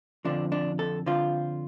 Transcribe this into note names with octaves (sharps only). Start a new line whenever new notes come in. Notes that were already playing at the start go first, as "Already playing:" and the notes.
F2 D3 F3 D4
D4
A4
F2 D3 F3 F4